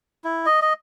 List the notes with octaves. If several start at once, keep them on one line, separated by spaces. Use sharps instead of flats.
E4
D#5
D#5